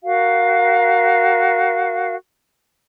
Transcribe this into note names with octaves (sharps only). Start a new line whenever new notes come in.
F#4 A#4 F5